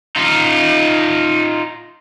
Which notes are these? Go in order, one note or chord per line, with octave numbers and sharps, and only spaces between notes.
D#4 F4